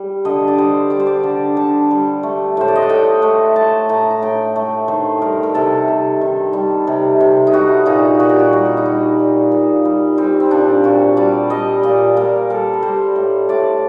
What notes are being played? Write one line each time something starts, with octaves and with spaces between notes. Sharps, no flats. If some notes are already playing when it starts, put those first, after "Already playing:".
Already playing: G3
D3 D#5
D5
G3 C5
G3 D5
C5
D5
D3
D3 A5
G3
A3
A2 C5
D5
D#5
F#5
A2 G5
A3 F#5
A3 A5
A2 A#5
A#5
A2 G5
A3
D#3 C5
G3 A#4
A#4
C3 A4
C3
D#3
G3
C3
C3
D#4
G3 F#4
A#2 D#4
A#2 F#4
G4
F#4
G3 D#4
F#4
D#4
G3
A#2
A#2
G3
G3 C4
C4
A#2 D4
A#2 F#4
G3 D5
G3 D#5
A#2 D5
A#2 A#4
G3 A4
A#4
G3 C5
A2
A2 D5